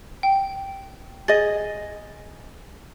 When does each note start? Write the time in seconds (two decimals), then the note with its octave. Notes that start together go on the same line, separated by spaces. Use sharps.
0.23 G5
1.28 G#4 D#5 A6